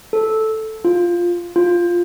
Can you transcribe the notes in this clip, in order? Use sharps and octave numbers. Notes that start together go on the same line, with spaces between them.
A4
F4
F4